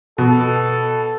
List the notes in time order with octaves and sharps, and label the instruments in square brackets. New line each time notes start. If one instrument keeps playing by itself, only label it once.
[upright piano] B2 [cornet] A4